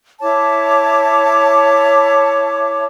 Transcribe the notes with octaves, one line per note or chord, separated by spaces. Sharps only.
E4 C#5 A5 D6